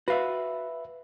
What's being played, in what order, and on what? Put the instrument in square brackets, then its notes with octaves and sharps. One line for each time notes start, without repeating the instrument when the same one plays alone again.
[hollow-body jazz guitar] F#4 F5 [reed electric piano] B4 E5